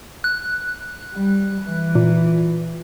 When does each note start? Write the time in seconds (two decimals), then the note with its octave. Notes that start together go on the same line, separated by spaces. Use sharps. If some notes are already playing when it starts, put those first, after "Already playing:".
0.24 F#6
1.14 G3
1.62 E3
1.95 A#2